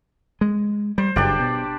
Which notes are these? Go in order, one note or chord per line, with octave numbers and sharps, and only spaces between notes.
G#3
G3 C5
F#1 G2 D4 G4 D5
B2